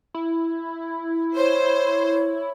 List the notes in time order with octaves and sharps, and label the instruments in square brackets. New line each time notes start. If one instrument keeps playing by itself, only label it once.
[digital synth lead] E4
[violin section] C5 [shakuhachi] C#5